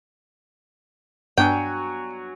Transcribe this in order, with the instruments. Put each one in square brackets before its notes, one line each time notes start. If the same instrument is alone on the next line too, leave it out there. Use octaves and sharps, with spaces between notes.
[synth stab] G2 B3 D4 [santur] F#3 F#4 G#5 [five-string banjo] G5